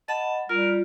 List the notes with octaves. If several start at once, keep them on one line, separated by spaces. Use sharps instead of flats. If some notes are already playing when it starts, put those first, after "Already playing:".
D#5 F#5 A5 B5
G3 F4 A#4